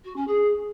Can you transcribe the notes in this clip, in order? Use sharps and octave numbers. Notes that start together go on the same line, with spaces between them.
F#4
C#4
G#4